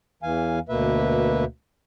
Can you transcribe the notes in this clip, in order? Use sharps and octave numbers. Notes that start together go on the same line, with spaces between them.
E2 E3 F5 G#5
D2 B2 A#3 B4 E5